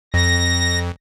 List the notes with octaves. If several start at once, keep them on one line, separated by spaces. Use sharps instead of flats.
F2 A#6